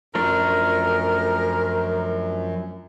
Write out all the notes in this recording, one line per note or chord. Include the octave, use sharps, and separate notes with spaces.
F#2 F3 A3 D4 A#4